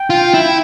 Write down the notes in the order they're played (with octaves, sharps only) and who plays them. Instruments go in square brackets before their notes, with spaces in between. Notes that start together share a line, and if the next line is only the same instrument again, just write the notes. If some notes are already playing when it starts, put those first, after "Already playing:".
Already playing: [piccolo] G5
[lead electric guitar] F4
E4